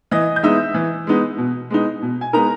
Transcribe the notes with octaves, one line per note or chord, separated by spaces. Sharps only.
E3 D#5 D#6
G6
G#3 B3 D#4 E5 E6
E3
G#3 B3 D#4
B2
G#3 B3 D#4
B2
G#5
G#3 B3 D#4 A#4 A#5